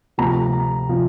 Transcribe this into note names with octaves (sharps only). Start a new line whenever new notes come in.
D2 C3 F3 A#5
C3 F3